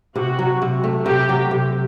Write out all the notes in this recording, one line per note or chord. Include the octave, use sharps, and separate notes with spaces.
C3 F#4
F#3
C3
A3
C3 G4
F#3
C3